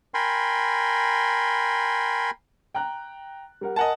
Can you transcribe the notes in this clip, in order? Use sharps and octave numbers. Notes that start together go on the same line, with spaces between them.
A#4 G5 G#5 B5 C6
G5 A#5 F#6
G3 A#4 F#5
A#4 D#5 F#5 G#5 A5